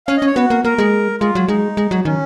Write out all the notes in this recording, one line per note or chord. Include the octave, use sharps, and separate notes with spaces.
C#4 F5
D#5
C#4 C#5
B3 F#4
A#3
A#3 A#4
G#3
G#3 F4
F#3
G#3 D#4
G#3
F#3
D#3 C#4